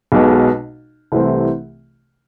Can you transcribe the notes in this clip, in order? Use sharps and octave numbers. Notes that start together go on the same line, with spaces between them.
B1 B2 G#3
C2 C3 E3 A3 C4